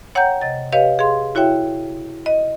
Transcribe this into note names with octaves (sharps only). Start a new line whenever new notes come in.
C#5 F#5 G5 A#5 G6
C3 D#5 A6
G4 B4 C#5 D#5 F5
G#4 F5 C6
E4 F#4 C#5 E5 G5
D#5